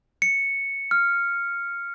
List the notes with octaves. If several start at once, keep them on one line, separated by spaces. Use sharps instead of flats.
C#7
F6